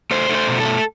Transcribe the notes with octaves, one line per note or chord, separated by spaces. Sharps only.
A3 C5
A3
C5
B2
A4
A3